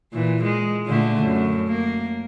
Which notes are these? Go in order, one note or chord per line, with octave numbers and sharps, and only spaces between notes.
A#2 E3
G#3
A#2 D3 A3
F#2
A#3